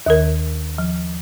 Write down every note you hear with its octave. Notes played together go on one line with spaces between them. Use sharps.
D#2 D#3 A#4
F3